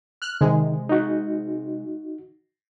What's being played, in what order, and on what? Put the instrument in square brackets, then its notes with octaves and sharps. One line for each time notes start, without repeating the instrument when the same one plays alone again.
[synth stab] F6 F#6
[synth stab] C3 G#3 [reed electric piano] D#3
[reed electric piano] D#4 F#4